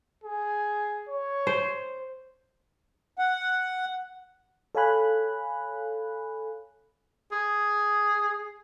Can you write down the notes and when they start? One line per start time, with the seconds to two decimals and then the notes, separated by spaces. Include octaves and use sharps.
0.24 G#4
1.09 C#5
1.47 C5
3.18 F#5
4.75 A4 C#5 F5 G#5 B5 F#6
7.32 G#4